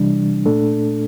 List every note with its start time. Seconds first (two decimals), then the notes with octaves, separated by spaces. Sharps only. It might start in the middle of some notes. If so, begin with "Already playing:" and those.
Already playing: C3 E3 G3 D4
0.46 A#2 A3 D4 A4